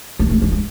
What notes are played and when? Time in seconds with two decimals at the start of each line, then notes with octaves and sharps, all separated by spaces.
0.19 G#3
0.30 A3
0.42 G#3
0.52 G#3